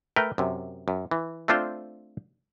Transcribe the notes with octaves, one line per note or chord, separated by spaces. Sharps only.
A3 A#4 B4 G5
F#2 C3
F#2
E3
A3 C4 D4 F4 C5